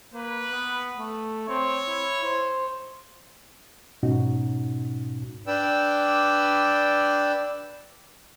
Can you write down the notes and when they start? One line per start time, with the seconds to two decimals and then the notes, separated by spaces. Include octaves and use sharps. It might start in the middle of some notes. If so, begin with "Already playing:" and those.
0.14 A#3 B4
0.52 B3
0.98 A3
1.49 C4 C#5
1.88 E4
2.24 C5
4.03 G#2 B2 C#4 D#4 F#4
5.47 D4 B4 D5 G5 E6